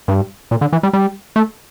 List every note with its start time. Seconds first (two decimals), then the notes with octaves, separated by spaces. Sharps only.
0.08 G2
0.51 A#2
0.61 D3
0.73 E3
0.83 G3
0.93 G3
1.36 A3